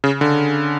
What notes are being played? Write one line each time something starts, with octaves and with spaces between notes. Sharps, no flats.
C#3
D3